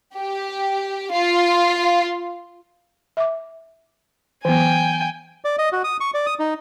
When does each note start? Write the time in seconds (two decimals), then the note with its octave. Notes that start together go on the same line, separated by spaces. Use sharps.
0.17 G4
1.12 F4
3.17 E5 D6
4.45 E3 F#3 B3 G5 G#5
5.45 D5
5.59 D#5
5.73 F#4
5.84 D#6
6.00 C#6
6.14 D5
6.26 D#6
6.39 D#4